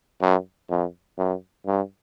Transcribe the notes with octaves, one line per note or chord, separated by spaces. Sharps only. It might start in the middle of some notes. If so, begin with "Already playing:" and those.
F#2
F2
F#2
G2